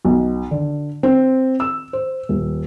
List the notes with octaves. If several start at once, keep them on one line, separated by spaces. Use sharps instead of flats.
B1
D3
C4
E6
C5
D#1